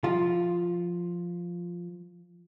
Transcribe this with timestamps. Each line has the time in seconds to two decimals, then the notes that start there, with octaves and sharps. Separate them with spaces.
0.04 F3 F4